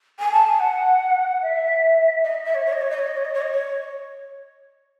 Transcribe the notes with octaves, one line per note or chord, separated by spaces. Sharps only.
G#5
A5
G#5
F#5
E5
D#5
E5
E5
C#5
C#5
D#5
C#5
D#5
C#5
D#5
C#5
D#5
C#5
D#5
C#5